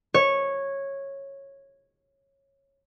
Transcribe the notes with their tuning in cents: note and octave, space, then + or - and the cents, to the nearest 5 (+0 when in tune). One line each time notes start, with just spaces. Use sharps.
C#5 -10